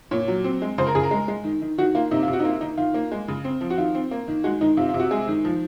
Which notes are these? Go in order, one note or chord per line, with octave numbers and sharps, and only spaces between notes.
A#2 C#5
F#3
C4
G#3
C#3 C5
A#4
C#3 G#4
A#4
G#3
G#3
D#3
D#3
D#3 F#4
A#3 F4
C3 D#4
F4
C3
F#4
D#4
A#3 F4
D#3 D#4
D#3 F4
A#3
G#3
C#3
C4
F3
F#4
D#3 F4
C4
A#3
D#3
G#3 F#4
D#3 D#4
C3 F4
F4
C3
F#4
G#3 G#4
D#3
F3